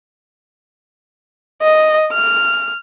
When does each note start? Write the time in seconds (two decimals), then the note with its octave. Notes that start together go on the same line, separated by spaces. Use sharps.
1.62 D#5
2.13 F6